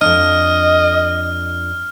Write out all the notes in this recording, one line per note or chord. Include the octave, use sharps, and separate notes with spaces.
F2 D4 D#5 F6